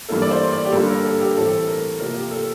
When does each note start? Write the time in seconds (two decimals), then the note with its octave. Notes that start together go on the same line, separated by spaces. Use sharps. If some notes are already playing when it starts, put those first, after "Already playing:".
0.09 G2 E3 A#3 A4
0.22 D5
0.31 C5
0.52 D5
0.65 G4
0.72 G2 D3 G3 A#3 A4
0.89 A#4
1.05 A4
1.21 G4
1.37 A2 E3 G3 C4 A4
1.67 A#4
2.00 C3 F3 A#3 A#4
2.16 G4
2.31 A4